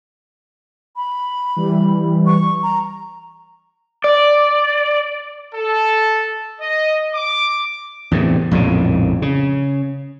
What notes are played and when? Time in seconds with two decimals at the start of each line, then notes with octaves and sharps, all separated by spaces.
0.96 B5
1.56 E3 G3
2.26 C#6
2.63 A#5
4.04 D5
5.55 A4
6.61 D#5
7.14 D6
8.11 E2 A2 C3
8.51 A#1 F2 A2 C#3
9.22 C#3